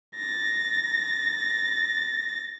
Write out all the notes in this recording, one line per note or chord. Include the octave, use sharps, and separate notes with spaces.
A6 A#6